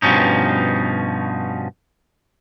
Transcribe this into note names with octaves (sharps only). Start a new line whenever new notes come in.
G2 B2 F3 C#4 D#4